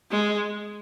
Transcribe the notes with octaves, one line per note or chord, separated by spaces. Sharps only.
G#3